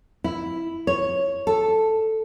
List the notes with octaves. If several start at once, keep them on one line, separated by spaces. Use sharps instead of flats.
E4
C#5
A4